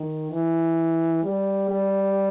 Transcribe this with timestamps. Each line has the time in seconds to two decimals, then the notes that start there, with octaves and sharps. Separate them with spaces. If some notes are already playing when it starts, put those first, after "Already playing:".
Already playing: D#3
0.32 E3
1.23 G3
1.69 G3